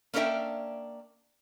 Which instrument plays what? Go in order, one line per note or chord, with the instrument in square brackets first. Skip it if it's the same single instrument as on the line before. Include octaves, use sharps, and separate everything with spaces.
[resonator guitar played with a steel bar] A#3 C#4 D4 A#4 E5 G5